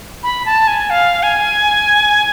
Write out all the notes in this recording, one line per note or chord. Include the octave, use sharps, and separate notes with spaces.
B5
A5
G#5
F5
G#5